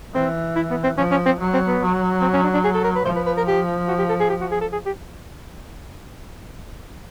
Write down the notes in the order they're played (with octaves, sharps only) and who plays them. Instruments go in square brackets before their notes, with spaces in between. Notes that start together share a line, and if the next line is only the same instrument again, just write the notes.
[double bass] E3 [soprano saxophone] C4
[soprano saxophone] E4
B3
C4
[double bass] F3 [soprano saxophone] C#4
[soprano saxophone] C#4
C4
[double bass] F#3
[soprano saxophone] C4
B3
[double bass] F#3
[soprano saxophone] C4
C#4
D4
D4
G#4
A4
A#4
B4
[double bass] F3 [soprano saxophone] C5
[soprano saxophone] B4
B4
A#4
G4
F#4
G4
A4
G#4
G4
F#4
G#4
A4
G#4
G4